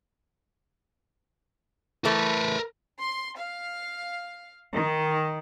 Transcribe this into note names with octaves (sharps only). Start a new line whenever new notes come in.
E3 A3 A#4 B4
C6
F5
D#3